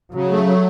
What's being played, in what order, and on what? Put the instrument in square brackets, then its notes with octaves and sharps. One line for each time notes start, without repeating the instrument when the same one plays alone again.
[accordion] C#3 [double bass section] F#3
[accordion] A3
F#3